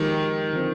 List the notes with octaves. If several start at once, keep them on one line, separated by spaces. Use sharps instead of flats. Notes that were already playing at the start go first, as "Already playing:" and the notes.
Already playing: D#3 F3 G#3 D#4 G4 A#4
D3 F3 C4